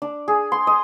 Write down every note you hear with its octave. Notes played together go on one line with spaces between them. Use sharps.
D4
G#4
C6
D#5